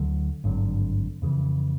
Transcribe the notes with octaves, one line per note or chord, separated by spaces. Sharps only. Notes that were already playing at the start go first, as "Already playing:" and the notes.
Already playing: D2 D3 F#3
G#1 G2 D3 F#3
F2 C#3 E3